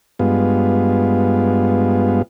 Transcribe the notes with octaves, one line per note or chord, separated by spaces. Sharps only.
G2 G#3 B3 F4